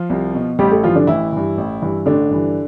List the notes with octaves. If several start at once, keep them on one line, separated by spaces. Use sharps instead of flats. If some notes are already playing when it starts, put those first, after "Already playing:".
Already playing: F3 F4
C2
B2
A1 G3 G4
A3 A4
G2 E3 F3 F4
D3 D4
A1 E3 E4
G2 E3
A1
G2 E3
A1 D3 D4
G2 E3